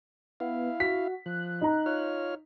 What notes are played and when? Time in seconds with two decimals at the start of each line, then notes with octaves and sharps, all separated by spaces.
0.40 B3 E4 F5
0.80 F#4 B6
1.26 F3 F#6
1.61 D#4 A#5
1.86 F4 C#5 F6